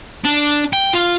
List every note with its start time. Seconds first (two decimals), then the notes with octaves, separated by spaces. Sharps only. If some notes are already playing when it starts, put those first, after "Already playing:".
0.24 D4
0.73 G5
0.94 F4